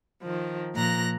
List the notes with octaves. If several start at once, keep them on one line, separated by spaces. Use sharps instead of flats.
D#3 F3
A#2 F3 A#5 F#6 A#6